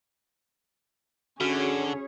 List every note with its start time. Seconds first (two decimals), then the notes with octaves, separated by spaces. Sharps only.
1.40 D3 C#4 F#4 G#4 C#5